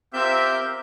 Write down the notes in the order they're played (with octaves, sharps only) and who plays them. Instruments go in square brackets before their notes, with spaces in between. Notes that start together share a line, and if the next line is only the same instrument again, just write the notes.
[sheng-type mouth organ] C4 G6 [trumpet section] F4 A#4 E5 [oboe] G4